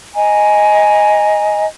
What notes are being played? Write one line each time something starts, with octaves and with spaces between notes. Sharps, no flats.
D#5 G#5 A#5